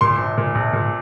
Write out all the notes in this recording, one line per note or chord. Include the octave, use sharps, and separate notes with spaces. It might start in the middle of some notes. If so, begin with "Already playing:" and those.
A#2 C6
A#1
A#2
A#1
A#2